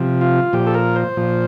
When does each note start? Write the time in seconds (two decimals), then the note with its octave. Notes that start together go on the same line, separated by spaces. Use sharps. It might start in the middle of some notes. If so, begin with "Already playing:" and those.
Already playing: C3 F3
0.21 F4
0.53 A#2 F3 G4
0.67 A4
0.74 A#4
0.96 C5
1.17 A#2 F3